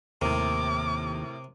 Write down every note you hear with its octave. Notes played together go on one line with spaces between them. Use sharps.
D#2 A2 C3 A#4 D6